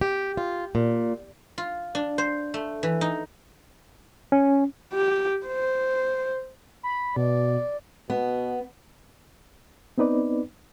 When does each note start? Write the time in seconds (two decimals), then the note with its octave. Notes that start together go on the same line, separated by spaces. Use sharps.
0.01 G4
0.37 F4
0.75 A#2
1.58 F4
1.95 D4
2.18 C5
2.54 A3
2.83 E3
3.01 D#4
4.32 C#4
4.93 G4
5.46 C5
6.83 B5
7.16 B2 D5
8.10 B2 B3
9.98 B3 C4 D#4 B4 D5